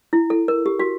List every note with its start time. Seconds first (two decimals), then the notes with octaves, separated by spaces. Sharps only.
0.13 E4
0.30 A4
0.48 A#4
0.66 G4
0.79 F#4